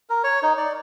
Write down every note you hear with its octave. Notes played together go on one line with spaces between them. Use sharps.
A#4
C#5
D#4
D5